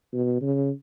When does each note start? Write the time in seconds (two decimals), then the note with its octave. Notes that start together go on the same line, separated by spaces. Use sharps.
0.13 B2
0.41 C#3